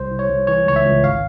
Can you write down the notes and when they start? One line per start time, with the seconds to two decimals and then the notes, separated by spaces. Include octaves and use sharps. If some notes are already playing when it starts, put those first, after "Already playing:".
Already playing: C2 C5
0.10 C2
0.19 C#5
0.28 C2
0.47 E3 C#5
0.66 C#2 C#5
0.76 E5
0.85 C#2
1.03 G#1 F5